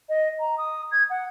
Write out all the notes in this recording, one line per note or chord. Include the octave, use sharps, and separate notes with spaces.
D#5
A#5
D#6
G#6
F#5